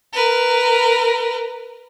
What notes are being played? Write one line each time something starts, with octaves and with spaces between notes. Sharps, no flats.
A#4 B4